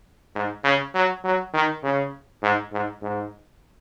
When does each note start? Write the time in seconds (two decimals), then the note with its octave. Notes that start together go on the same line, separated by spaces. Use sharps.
0.35 G#2
0.64 C#3
0.95 F#3
1.24 F#3
1.54 D#3
1.83 C#3
2.43 G#2
2.72 G#2
3.02 G#2